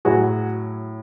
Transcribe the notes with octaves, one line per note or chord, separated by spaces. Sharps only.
A2 F#3 F#4 G#4